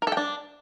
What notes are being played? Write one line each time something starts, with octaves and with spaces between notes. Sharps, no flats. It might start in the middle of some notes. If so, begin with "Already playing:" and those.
A#4
A4
G5
D4